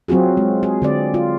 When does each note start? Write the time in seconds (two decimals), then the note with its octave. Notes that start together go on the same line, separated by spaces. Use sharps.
0.08 F#3 C4 F4 F#4 G#4
0.37 G#3
0.63 G#4
0.82 D3 C4 D5
1.14 F4